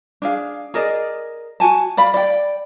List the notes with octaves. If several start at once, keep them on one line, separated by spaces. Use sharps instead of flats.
D4 G#4 F5
G#4 A#4 D5 D#5
F#4 G4 G#5 A5
D5 F5 B5
D5 G5